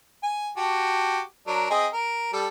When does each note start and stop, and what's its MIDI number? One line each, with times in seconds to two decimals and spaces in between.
0.23 0.49 80
0.57 1.20 66
0.57 1.20 67
0.57 1.20 81
1.47 1.70 54
1.47 1.70 62
1.47 1.70 70
1.70 1.87 60
1.70 1.87 68
1.70 1.87 75
1.93 2.30 70
2.33 2.47 55
2.33 2.47 69